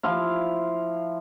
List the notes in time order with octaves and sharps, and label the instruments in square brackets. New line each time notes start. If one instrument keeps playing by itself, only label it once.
[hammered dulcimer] F3 E4 F5